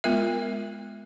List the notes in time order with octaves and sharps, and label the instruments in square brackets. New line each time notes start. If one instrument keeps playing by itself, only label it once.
[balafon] G#3 B3 F4 A#4 E5